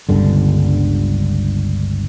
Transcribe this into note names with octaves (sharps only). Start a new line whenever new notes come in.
G1 C#2 G2 D3